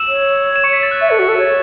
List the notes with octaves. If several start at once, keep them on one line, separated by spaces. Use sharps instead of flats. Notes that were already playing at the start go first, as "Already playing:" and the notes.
Already playing: E6 E7
C#5
E7
C#6 C#7
B6
A6
F#6
E5
A4
F#4
A4
C#5